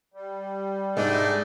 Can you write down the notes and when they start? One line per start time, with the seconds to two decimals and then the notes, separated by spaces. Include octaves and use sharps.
0.14 G3
0.97 G#2 G#3 A3 D4 D#4